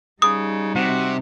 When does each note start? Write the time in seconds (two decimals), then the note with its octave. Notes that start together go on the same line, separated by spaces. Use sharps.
0.22 C#3 G3 D#4 D#6
0.75 C3 F#4